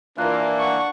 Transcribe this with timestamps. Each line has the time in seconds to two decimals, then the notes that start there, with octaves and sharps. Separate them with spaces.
0.18 E3 A#3 D4 F4 A#4 D5 F#6
0.59 F#5 C#6